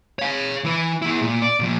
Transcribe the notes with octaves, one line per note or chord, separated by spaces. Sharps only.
C#5 F5
E3 B4
E4 G#4
A#2
D5
A#2 F3